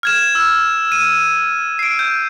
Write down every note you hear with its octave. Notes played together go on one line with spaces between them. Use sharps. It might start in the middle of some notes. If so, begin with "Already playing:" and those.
F6 G#6 E7
E6
D#7
C7 D7
G6